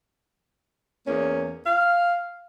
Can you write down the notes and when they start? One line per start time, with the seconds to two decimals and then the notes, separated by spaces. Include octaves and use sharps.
1.07 E2 A#3 C#4
1.67 F5